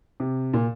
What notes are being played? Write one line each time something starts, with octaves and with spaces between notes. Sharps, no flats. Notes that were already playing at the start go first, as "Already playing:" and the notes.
C3
A#2